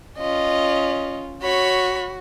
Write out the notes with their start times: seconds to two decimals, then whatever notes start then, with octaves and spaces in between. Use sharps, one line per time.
0.18 C#4 F4 D#5
1.42 F#4 C#5 B5